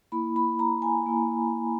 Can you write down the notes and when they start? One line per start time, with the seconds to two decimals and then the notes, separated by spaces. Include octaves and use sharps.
0.12 A#3 E4 B5
0.36 B5
0.59 A#5
0.82 G#5
1.06 A#3 E4